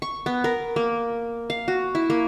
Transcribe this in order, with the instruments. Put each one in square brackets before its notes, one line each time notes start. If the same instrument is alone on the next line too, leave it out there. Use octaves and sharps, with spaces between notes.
[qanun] C#6
B3
A#4
A#3
F5
F#4
E4
A#3